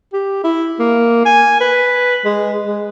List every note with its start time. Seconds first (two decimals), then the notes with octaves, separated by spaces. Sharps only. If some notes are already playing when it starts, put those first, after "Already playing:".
0.13 G4
0.44 E4
0.79 A#3
1.25 G#5
1.60 B4
2.25 G#3
2.67 G#3